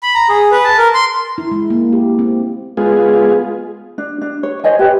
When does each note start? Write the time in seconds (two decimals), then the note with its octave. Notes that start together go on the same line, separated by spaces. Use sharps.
0.03 B5
0.15 A#5
0.29 G#4
0.51 B4
0.64 A5
0.77 A#4
0.94 C6
1.38 E4
1.51 G#3
1.70 A#3
1.93 G4
2.19 C4
2.77 G#3 B3 F4 G#4
3.98 D4
4.21 D4
4.43 C#5
4.64 C5 C#5 D#5 G#5
4.79 G4 B4 E5